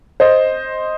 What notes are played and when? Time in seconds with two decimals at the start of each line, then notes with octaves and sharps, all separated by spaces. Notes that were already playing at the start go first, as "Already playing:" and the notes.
0.20 C5 D#5